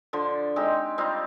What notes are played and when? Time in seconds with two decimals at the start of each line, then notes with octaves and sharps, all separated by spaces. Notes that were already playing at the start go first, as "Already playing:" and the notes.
0.13 D3 F3 C6
0.56 G#3 C4 D#4 G4
0.98 G3 C4 D#4 F4